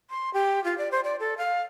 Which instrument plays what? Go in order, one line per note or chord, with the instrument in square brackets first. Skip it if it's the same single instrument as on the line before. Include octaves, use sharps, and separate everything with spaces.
[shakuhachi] C6
G4
F4
D5
C5
D5
A4
F5